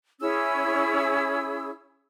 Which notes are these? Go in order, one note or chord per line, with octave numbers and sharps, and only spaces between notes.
C#4 E4 G#4 E6